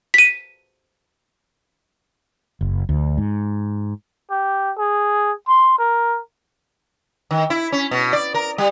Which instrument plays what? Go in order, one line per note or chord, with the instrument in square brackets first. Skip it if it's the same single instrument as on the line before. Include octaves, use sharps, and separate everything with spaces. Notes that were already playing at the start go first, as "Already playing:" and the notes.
[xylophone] B6 D#7
[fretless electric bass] F#1
D2
G#2
[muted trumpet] G4
G#4
C6
A#4
[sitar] D#3
E4
C#4
B2
D5
A#4
G3